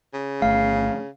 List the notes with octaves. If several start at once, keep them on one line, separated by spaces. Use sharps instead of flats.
C#3
G1 A3 F5